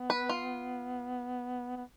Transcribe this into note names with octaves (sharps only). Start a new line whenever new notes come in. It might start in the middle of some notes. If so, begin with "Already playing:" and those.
Already playing: B3
B4
F4
B3